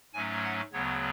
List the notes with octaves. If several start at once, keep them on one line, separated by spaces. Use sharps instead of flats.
G#2 F#3 A3 C#4 G#5
F#5
D2 C#3 F#3 B3 C#5